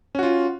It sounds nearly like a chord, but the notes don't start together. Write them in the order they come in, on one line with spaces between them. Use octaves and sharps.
C#4 F#4 F4